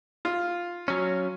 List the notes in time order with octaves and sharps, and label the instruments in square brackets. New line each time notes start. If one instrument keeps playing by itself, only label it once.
[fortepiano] F4
[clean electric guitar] F#3 C#4